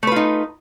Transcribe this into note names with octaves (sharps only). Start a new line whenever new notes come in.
A3 D#4 F4 B4